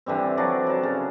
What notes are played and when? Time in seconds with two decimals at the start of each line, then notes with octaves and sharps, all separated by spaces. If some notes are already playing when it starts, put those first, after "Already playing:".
0.06 D3 E3 G3 C4
0.37 F3 F#3 F#4 D5
0.67 F#3 A5
0.83 C#3